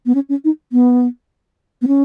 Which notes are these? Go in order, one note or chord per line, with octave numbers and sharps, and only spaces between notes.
B3
C#4
C#4
D#4
B3
B3
C#4